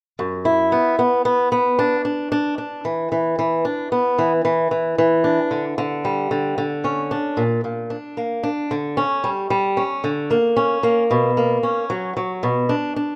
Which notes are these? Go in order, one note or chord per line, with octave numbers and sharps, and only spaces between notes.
F#2
E4
B3
B3
B3
B3
D4
D4
D4
D4
E3
E3
E3
D4
B3
E3
E3
E3
E3
D4
D3
D3
G3
D3
D3
C#4
D4
A#2
A#2
D4
A#3
D4
D3
C#4
G3
G3
C#4
D3
A#3
C#4
A#3
B2
A#3
C#4
F#3
F#3
B2
D4
D4